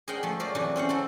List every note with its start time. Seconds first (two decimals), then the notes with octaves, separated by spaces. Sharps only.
0.08 G#4 A#4 C5 D#5 F#5 G5
0.23 F3 A3
0.40 F#3 G#4 A#4 C5 D5
0.55 C3 E3 F#3 D4
0.76 C4 C#4 C5 F#5
0.89 F#3 C4 A4